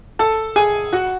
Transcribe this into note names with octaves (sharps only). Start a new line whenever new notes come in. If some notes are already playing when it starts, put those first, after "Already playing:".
A4 A5
G#4 G#5
F#4 F#5